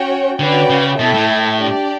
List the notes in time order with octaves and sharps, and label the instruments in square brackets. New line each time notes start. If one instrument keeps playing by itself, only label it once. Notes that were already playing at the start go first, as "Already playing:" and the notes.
Already playing: [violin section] C#4 F#4 C#5 G5
[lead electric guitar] D3 [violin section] C#4 F#4 B4 D5 G5
[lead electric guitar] C#3
[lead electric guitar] B2 [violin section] E4 A4 E5 G5
[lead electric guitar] A2
[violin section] D4 G4 D5